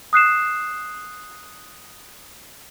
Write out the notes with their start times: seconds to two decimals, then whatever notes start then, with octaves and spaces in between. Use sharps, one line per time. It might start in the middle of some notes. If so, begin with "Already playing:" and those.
0.13 D#6 F#6 C7 E7